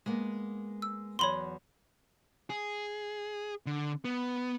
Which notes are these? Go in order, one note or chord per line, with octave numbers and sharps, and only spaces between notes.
G#3 A#3 B3
E6
E2 F#3 C#5 B5 C6
G#4
D3
B3